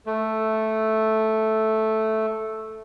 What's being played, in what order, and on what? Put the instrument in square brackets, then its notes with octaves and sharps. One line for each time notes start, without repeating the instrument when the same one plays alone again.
[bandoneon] A3 [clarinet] A4